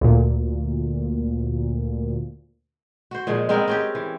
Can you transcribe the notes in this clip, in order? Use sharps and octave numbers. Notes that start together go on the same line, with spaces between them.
D2 A#2
F#4 C5
A#2 F3 G#3
G#3 B3 C4 A#4
C4 C#4 G4
E3